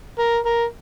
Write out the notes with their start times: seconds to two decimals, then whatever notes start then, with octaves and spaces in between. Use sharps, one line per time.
0.19 A#4
0.46 A#4